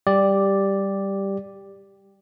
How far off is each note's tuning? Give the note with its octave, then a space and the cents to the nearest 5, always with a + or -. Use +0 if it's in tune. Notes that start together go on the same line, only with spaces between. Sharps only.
G3 +0 G4 +5 D5 +0